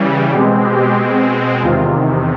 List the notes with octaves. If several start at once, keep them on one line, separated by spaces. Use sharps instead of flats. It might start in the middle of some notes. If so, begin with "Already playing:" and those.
Already playing: C#3 E3 G3
B2 G#3 C4 G4
G4
E2 C3 D#3 F4